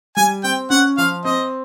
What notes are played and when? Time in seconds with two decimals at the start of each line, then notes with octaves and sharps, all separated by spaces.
0.17 G3 G#5
0.44 C4 G5
0.70 C#4 F#5
0.98 F3 F5
1.25 C4 D#5